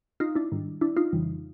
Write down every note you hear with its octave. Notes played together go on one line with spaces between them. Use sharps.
D#4 F4
D4 E4
G#2 D#3 G3
D4 E4
D#4 F4
F2 C#3 E3 G3